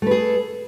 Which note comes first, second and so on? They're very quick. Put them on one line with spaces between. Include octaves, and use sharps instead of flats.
A3 B4 G#4